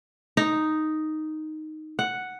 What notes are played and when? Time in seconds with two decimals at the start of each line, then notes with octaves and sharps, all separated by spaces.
0.37 D#4
1.99 F#5